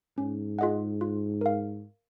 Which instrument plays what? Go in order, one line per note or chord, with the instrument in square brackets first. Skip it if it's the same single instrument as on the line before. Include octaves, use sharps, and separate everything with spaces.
[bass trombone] G#2 [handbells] C#4
[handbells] F4 G#4 D#5 F#5
F4
A#4 F5